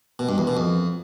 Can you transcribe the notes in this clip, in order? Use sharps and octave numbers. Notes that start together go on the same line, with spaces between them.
B2
G2
E2
B2
F2